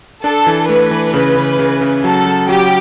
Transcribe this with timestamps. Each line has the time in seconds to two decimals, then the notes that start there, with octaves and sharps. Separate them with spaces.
0.24 D4 A4
0.47 E3
0.69 A3 B4
0.91 E3
1.14 C#3
1.37 C#3
1.59 C#3
1.81 C#3
2.04 F#3 A4
2.26 F#3
2.49 F#3 G4